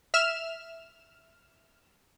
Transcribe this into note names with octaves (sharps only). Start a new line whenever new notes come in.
E5 F6 E7